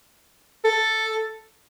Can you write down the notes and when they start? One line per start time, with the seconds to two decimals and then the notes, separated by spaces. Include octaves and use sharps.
0.64 A4